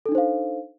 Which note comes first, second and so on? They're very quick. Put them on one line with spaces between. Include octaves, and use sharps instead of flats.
A4 D4 D#4 C5 F5